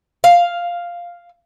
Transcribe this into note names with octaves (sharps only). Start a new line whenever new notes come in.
F5